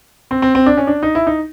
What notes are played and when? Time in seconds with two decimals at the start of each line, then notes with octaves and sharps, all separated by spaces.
0.31 C4
0.42 C4
0.55 C4
0.66 D4
0.77 C#4
0.87 D4
1.03 D#4
1.15 E4
1.27 D#4